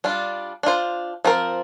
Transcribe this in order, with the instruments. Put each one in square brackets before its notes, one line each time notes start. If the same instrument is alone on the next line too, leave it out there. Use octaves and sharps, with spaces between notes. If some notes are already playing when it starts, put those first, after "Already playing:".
[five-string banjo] G3 D4 F4
D4 F4 C5
F3 C4 A#4